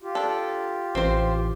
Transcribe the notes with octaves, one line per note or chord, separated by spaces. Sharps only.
F4 G4
D4 A4
A1 C4 C5